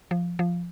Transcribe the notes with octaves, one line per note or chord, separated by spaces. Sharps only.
F3
F3